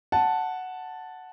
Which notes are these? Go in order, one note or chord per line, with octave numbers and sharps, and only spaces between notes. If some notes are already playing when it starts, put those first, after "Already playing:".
F#5 A5